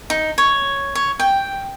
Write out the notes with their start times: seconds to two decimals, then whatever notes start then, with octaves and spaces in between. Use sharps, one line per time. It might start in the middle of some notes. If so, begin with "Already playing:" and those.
0.10 D#4
0.38 C#5
0.95 C#5
1.19 G5